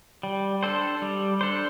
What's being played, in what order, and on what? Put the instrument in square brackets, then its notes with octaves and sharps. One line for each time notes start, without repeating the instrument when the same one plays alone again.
[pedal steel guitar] G3
D4 A4 C5
G3
D4 A4 C5